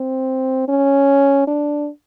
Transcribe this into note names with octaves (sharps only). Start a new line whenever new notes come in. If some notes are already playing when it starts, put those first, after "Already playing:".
Already playing: C4
C#4
D4